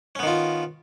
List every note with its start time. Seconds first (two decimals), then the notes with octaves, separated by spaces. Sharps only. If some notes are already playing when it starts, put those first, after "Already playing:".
0.15 C#4
0.19 B3
0.23 D#3
0.27 F4